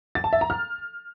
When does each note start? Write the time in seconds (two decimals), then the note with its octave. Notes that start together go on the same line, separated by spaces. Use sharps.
0.15 A6
0.24 A5
0.33 E5
0.41 A#5
0.50 F6